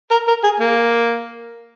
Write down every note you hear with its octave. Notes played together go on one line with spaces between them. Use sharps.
A#4
A#4
G#4
A#3